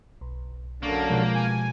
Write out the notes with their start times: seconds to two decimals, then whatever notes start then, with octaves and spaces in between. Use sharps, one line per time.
0.21 B1
0.83 F#2 D3 A#3 D4 C#6 D6
1.10 B2 F3 G#3 G4 G6
1.35 G#5